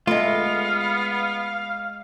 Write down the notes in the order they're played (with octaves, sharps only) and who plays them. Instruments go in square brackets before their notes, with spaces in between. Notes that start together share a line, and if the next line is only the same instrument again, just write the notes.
[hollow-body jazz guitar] G#3 F4 [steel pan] A3 [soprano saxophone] B3 [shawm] F5